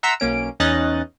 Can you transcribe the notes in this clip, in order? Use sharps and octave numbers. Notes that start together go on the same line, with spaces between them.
E5 F#5 A#5 C6 E6 B6
B1 A#3 C#4 D7
E2 C#4 D#4 D#5 F#6 A6